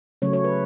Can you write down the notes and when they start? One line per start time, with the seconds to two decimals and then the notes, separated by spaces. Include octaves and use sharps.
0.22 C#3 F#3 A3 C#4 C#5
0.33 C#5
0.44 B4